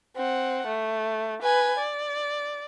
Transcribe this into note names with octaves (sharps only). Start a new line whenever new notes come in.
C4 F#5
A3
B4 G#5
D5